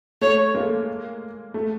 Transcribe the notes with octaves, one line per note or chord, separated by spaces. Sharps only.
A3 C#5
G#3 A#3
A3